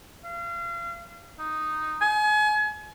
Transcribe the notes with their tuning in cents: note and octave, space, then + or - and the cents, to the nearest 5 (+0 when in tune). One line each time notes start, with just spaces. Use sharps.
F5 -35
D#4 -5
G#5 +35